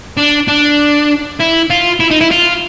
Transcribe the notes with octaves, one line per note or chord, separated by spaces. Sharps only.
D4
D4
E4
F4
E4
D#4
E4
F4